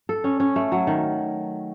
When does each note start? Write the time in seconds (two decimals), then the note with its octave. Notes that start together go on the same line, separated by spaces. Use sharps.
0.09 A4
0.24 C#4
0.40 C#4
0.56 A3
0.72 F#3
0.87 D#3